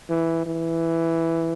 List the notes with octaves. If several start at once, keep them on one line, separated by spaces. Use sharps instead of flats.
E3
E3